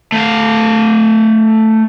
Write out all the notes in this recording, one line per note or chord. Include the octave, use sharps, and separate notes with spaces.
A3 F5